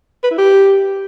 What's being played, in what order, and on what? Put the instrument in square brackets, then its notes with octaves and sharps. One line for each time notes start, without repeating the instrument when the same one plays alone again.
[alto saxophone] B4
E4
G4